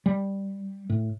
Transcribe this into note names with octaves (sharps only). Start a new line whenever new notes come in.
G3
A2